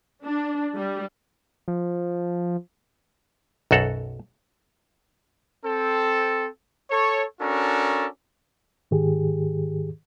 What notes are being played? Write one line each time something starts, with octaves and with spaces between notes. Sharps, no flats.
D4
G3
F3
B1 F#2 F#4 A4 F5 F#5
C4 A4
A4 C#5
C#4 D4 F#4 A4 A#4
G#2 D#3 G4 G#4